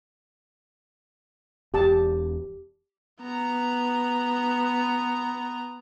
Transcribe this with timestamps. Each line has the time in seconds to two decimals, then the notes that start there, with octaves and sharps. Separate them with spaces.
1.74 E1 G4 A5
3.22 B3 A#5